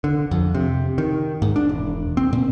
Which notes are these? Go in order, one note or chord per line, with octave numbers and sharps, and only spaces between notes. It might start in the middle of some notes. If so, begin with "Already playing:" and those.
D3
F2
C3
D#3
G#2
D4
E1
C4
A#2